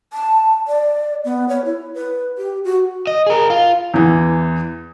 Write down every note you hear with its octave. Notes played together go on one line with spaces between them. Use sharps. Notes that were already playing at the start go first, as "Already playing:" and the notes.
A5
D5
B3
C#5
E4
B4
G4
F#4
D#5
G#4 A#4
F4
E2 E3